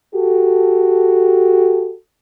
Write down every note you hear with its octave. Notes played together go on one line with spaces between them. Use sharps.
F#4 G4 A4